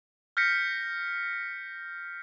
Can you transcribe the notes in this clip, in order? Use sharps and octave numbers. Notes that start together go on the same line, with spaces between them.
F6 G6 A#6 B6 C#7